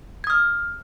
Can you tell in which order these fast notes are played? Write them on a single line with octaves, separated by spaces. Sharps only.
G#6 D#6 F6